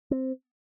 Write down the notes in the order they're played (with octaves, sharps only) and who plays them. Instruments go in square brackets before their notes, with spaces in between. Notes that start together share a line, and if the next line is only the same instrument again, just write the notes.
[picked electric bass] C4